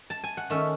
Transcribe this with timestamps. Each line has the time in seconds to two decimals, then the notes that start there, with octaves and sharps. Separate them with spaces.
0.10 A5
0.24 G#5
0.37 F#5
0.50 D#3 A3 C#4 E5